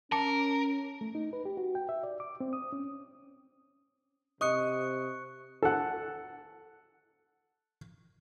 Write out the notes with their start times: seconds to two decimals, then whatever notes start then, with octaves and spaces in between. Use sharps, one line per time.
0.12 C#4 A#4 A5 D6 C#7
1.01 A3
1.15 D#4
1.33 B4
1.45 G4
1.57 F#4
1.75 G5
1.89 E5
2.03 D5
2.20 D6
2.40 C4
2.53 D#6
2.72 C#4
4.41 C3 D#5 C#6 D#6 F#6 C#7
5.62 A4 F#5